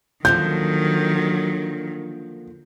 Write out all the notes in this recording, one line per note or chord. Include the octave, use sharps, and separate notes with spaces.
D3 D#3 F3 F#3 A#3 G6